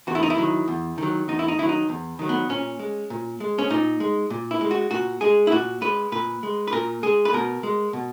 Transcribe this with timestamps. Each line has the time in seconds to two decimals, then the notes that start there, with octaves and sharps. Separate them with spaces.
0.07 E2 F#4
0.15 E4
0.23 D#4
0.30 E4
0.38 D#3 F#3
0.68 E2
0.98 D#3 F#3
1.28 E2 D#4
1.39 E4
1.48 D#4
1.59 D#3 F#3 E4
1.69 D#4
1.89 E2
2.19 D#3 F#3
2.29 B3
2.49 A#2 C#4
2.80 G#3
3.10 A#2
3.40 G#3
3.58 C#4
3.70 A#2 D#4
4.00 G#3
4.30 A#2
4.51 E4
4.61 G#3
4.71 F#4
4.91 A#2 F#4
5.21 G#3 G#4
5.47 E4
5.52 A#2 F#4
5.81 G#3 B4
6.12 A#2 B4
6.43 G#3
6.68 B4
6.72 A#2 A#4
7.03 G#3 G#4
7.25 B4
7.33 B2 A#4
7.63 G#3
7.93 B2